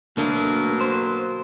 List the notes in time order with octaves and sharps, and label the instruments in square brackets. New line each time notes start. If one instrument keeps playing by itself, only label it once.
[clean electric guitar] D2 D3 A3 [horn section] B2 F#3 A#3
[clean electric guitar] C5